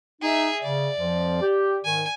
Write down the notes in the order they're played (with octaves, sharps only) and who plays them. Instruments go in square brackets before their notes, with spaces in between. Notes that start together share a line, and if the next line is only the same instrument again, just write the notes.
[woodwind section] D#4 [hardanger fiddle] G#4 E5
[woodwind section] C#3 [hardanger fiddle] D5
[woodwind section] F2 F3
G4
[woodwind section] G#2 D#3 [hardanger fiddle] G#5